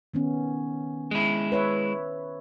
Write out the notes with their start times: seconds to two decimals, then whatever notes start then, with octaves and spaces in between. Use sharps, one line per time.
0.14 D#3 B3 C#4
1.11 G#3 E4
1.52 B4 C#5 E5